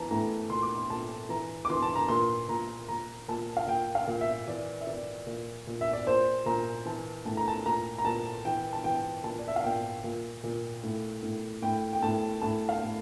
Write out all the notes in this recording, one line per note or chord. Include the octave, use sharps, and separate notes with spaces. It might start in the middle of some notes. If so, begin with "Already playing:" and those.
Already playing: E3 A5 A#5
A2 A#5
A#2 C6
D6
C6
A#2 A5
E3 A#5
D6
E3 C6
A5
A#5
A#2 C6
A#2 A#5
A#2 A#5
A#2 A5
F5
A#2 G5
F5
A#2
E5
E3 D5
E5
E3 D5
A#2
A#2
E5
D5
A#2 C5
A#2 A#5
E3 A5
A2 A5
A#5
A5
A#2 A#5
A#5
A#2 A5
E3 G5
A5
E3 G5
A#2 A5
D5
E5
F5
A#2 G5
A#2
A#2
A2
A2
A2 G5
G5
A2 A5
A2 A5
F5
A2